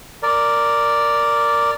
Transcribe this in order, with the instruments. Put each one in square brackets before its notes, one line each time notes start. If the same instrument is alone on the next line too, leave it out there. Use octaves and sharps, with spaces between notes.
[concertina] A#4 D5